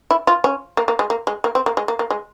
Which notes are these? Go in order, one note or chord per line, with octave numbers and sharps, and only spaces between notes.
E4
F4
C#4
A#3
A#3
G#3
A#3
G#3
A#3
C4
A#3
G#3
A#3
A#3
G#3